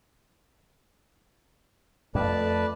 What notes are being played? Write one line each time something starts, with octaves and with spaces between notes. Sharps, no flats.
F2 A3 B4 D5 A5